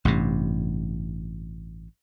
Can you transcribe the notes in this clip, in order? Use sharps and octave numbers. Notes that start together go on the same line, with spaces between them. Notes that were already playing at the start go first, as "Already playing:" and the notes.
A1 G2 C3